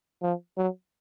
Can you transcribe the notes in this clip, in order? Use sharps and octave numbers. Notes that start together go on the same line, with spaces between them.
F3
F#3